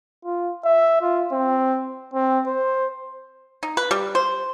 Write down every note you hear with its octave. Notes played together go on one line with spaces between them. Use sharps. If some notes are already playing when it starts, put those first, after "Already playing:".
F4
E5
F4
C4
C4
C5
D#4
B4
G3
C5